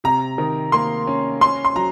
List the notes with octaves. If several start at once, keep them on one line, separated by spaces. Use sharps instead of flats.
C3 A#5
D#3
A#3 C6
C#4
C#4 C6
C6
F#3 A#5